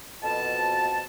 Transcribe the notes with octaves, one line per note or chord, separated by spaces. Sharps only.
F2 B2 A5